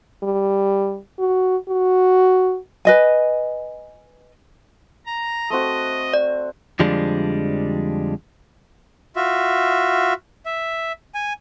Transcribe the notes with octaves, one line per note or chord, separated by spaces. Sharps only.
G3
F#4
F#4
B4 D#5 G#5
A#5
A3 C4 F#4 D#5
D5
F2 D3 F3 G3 G#3 D4
F4 F#4 E5
E5
G#5